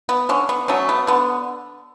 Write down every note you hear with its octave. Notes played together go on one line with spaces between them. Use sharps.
B3
D3 C#4
B3
F#3 A3 C#4
B3
D3 B3